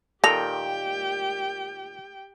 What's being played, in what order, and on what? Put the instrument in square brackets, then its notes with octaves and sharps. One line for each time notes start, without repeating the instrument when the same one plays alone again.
[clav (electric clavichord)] A#2 D#3 [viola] G4 G5 [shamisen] A4 [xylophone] A#6 F7